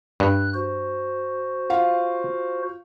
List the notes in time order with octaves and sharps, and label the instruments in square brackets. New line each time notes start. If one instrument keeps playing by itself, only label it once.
[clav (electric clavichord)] G2 [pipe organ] F#6
[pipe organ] F#4 C5
[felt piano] F4 F5